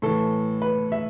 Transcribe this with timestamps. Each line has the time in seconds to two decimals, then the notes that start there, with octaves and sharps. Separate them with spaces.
0.02 A2 E3 A4
0.62 B4
0.92 E5